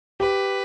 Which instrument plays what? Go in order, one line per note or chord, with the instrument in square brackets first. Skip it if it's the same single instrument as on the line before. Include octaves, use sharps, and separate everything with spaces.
[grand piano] G4 [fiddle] B4